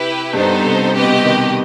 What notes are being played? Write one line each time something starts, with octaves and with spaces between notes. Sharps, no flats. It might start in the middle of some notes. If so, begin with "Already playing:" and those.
Already playing: C3 E4 G4 B4
G2 B3 D#4 A4 C5
C3
C3 G4 B4 D#5
B2
C3
D#3